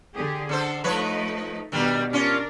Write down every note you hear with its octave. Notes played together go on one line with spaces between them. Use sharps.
D3 G4 G#4
D3 D4 A4 C5
F3 A3 D#4 B4 C#5
B2 D#3 G3 D4
C#4 D4 F4 A#4